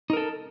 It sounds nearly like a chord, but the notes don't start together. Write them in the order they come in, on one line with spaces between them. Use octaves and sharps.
D#4 A#4 A4